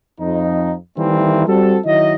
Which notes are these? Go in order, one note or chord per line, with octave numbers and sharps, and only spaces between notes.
F2 D#4
D#3 E3 G3 A3 A#3 C4
G3 C4 F#4 A4
D#3 F#3 E4 D#5